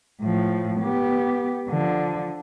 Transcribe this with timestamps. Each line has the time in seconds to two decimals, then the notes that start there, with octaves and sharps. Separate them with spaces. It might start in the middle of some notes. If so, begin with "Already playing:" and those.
0.22 A2 F3
0.82 B3 G4
1.69 D3 F3